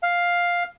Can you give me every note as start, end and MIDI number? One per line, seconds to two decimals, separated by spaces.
0.03 0.64 77